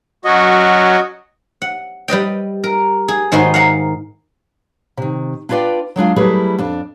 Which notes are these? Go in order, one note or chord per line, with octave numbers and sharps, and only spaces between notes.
F#3 C#4 F#4 D#5
F#5
G3 B4 D#5 G5
A#4
G#4
G#2 D#3 F#4 B4 D#5 C6
F5 F#5 A#5
C3 D#3
D4 E4 F4 B4 D5 G5
F#3 G#3 D4 F4
F#3 G3 A3 E4 G#4 B4
F2 D4